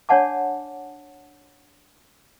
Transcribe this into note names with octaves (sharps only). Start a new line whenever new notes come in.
D4 C#5 D5 F#5 A5 D6